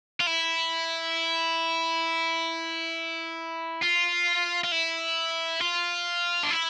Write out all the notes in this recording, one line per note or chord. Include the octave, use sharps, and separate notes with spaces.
F4
E4
F4
F4
E4
F4
D4
E4